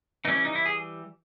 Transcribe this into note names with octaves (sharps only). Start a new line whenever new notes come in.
E3 G3 C#4 D#4
C#4
D#4
E4
G#4